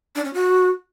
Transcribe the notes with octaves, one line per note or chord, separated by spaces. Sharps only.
D4
C#4
F#4